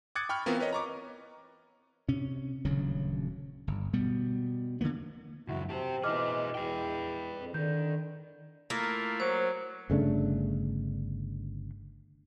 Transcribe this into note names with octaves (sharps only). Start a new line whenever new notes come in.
D6 D#6 F#6 G#6 A6 C#7
G5 B5 C#6 F6
E3 B3 C4 F4 A#4
A#4 B4 C#5 D#5
A#5 C#6 D6
C3 C#4
D#1 D2 C#3 F#3
G1
B2 G3 B3
D3 F3 A#3 B3
C#2 F#2 E4 F#4
C4 G4 C5 A5
B2 E3 G#4 C5 D#5 D6 F6
E2 B4 G5
F2
D3 D#3 G6
A3 A#3 E4 F4
F#3 C5
G1 C#3 A3 D4